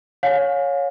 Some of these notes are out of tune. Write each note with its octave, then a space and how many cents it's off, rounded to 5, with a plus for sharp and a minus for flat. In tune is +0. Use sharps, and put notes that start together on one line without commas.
C#5 +0 F5 +30 G#5 +0